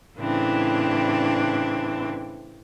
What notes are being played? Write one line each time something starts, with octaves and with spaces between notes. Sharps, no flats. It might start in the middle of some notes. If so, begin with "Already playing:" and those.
A2 C#3 E3 C4 D4